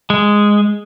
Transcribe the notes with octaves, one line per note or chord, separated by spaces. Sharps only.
G#3